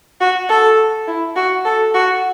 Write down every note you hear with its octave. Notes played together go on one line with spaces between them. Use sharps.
F#4
A4
E4
F#4
A4
F#4